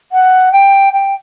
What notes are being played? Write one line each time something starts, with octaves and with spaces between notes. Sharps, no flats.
F#5
G5
G5